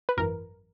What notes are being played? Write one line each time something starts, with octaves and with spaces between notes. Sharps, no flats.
B4
G#1 F#2 E3 A#4